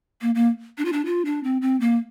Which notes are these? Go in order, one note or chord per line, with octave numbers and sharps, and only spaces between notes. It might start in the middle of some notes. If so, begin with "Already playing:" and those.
A#3
A#3
D4
F4
D4
F4
D4
C4
C4
A#3